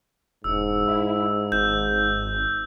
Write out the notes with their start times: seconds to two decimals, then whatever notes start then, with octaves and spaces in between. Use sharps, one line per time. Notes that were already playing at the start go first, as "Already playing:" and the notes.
0.44 E1 G#2 E6
0.87 E4
1.52 G#1 G6